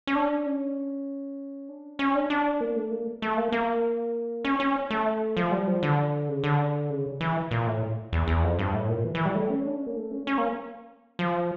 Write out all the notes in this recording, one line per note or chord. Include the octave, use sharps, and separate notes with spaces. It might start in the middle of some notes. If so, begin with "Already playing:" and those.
C#4
D4
C#4
D4
C#4
D4
D4
A#3
A3
A#3
A3
A#3
A#3
C#4
C#4
A3
F3
G3
F3
D3
C#3
D3
C#3
E3
A#2
A2
E2
E2
F2
G2
A2
A#2
E3
E3
G3
A3
C#4
D4
C#4
A#3
A3
C#4
C#4
A#3
F3